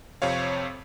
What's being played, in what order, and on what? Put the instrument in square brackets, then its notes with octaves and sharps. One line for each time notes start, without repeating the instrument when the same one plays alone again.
[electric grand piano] F2 C3 C4 C#5 F5